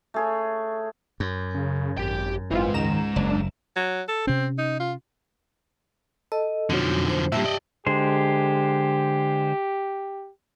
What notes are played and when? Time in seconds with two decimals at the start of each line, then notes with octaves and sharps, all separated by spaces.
0.14 A3 G#4 C#5
1.20 F#2
1.54 C#3
1.98 G#1 G4 G5
2.51 G1 E3 G#3 C4 D#4 F4
2.74 C#2 D#3 A#5 E7
3.16 F#1 D4
3.76 F#3
4.08 A4
4.27 C3 C4 C#4
4.58 D#4
4.80 F4
6.32 A4 D#5
6.70 F2 B2 D3 F3 F#3 D#4
7.09 C5
7.32 G2 A#2 G4 E5 G5 A5
7.45 D5 D#5
7.87 D3 G#3 G4 C5